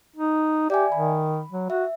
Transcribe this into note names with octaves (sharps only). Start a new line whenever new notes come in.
D#4
G4 D5 E5 G#5
D#3 B5
F#3
F#4 E5